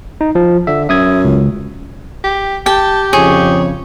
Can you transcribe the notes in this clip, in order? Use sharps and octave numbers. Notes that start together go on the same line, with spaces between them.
D#4
F3
D3 E5
F#2 E5 D#6 G#6
C#2
G4
G4 G5 A5
F2 C#3 F3 G#4 C#5